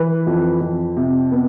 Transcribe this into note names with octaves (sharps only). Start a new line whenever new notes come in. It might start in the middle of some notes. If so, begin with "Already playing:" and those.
Already playing: E3 B4
F2
F2
C3
B3